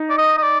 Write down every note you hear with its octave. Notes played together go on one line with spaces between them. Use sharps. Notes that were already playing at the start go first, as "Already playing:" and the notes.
Already playing: D#4
D5
D#5
D#5
D5